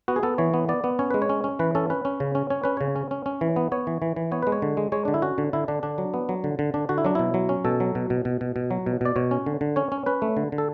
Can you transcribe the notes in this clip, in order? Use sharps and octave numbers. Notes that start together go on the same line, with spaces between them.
B3 F#4
G#4
B3 A4
E3 C#5
B3
B3 D5
B3
C#4 C#5
G#3 B4
C#5
C#4
C#4
E3 B4
C#4 A4
C#4 B4
C#4
C#3
C#4
C#4 C#5
C#4 B4
C#3 C#5
C#4
C#4
C#4
E3
B3
B3 C#5
E3
E3
E3
B3 C#5
G#3 B4
C#5
D3
G#3
G#3 C#5
D3 D4
E4
C#4 F#4
D3
D3 E4
D3 D4
D3 D4
F#3
B3
F#3
D3
D3
D3 D4
D3 F#4
E4
F#3 D4
B2 E4
F#3
C#4
B2 A4
F#3
B2
B2
B2
B2
B2
F#3
B2
B2 D5
B2 C#5
C#4
D3
D3
C#4 C#5
C#4
C#4 B4
A3
D3
D3
A4